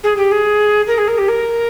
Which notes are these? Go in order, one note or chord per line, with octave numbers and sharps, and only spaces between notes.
G#4
G4
G#4
A#4
G#4
A#4
G4
A#4